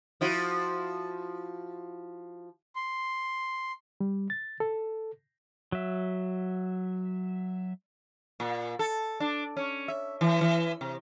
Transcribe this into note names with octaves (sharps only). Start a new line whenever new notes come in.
F3 E4 F#4
C6
G3
A6
A4
F#3 E5
A#2
A4
D4
C#4
E5
E3
E3
C3